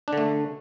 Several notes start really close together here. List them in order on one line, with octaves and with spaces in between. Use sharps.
D4 D3 A3